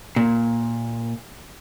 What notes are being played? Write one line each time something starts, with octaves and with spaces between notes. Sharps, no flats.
A#2